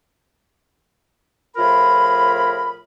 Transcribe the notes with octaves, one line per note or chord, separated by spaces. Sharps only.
A2 F3 F4 G#4 A#4 B5